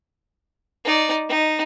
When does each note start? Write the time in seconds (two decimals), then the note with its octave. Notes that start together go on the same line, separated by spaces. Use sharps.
0.84 D#4 D5
1.29 D#4